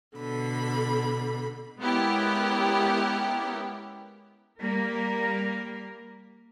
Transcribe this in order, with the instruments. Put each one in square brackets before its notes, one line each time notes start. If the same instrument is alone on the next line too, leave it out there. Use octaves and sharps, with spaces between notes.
[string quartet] B2 D3 B5
[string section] G#3 B3 C#4 E4 G4 A#4
[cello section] G3 A#3 A#4